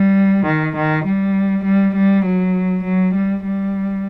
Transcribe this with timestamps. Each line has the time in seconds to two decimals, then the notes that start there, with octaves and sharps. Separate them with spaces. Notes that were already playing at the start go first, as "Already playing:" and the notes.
Already playing: G3
0.44 D#3
0.74 D#3
1.04 G3
1.64 G3
1.94 G3
2.24 F#3
2.83 F#3
3.13 G3
3.42 G3